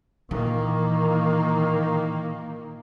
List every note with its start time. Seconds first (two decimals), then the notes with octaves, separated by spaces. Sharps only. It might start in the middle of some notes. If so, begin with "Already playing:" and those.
0.31 A#2 D#3 E3 A#3